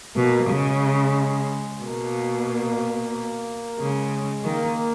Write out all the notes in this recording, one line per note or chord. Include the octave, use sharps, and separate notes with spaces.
B2 A#3
C#3 G#3
B2 A#3
C#3 G#3
D#3 A#3